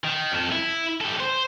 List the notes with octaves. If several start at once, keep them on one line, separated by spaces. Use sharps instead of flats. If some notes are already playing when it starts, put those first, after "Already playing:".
D#3
F2 A4
E4
G3 A4
C5